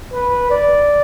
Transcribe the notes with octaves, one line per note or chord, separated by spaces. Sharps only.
B4
D5